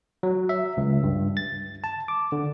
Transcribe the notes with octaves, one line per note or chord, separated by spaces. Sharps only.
F#3
E5
C#2
G2
A6
A5
D6
D3